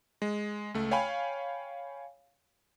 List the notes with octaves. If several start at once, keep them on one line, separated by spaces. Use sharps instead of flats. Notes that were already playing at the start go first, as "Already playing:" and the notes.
G#3
C#2 A3
C#5 F5 G5 G#5 B5